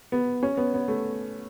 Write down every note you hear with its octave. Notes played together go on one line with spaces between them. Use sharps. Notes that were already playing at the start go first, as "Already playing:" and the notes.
B3
C#4
B3
B3
A3